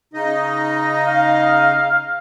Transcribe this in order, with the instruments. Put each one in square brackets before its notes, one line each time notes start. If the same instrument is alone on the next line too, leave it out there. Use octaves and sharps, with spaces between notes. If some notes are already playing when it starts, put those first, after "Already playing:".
[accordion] C#3 D#4 D#5
[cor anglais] F5